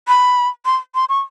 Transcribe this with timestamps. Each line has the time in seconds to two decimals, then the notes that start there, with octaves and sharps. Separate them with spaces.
0.08 B5
0.65 C6
0.95 C6
1.09 C#6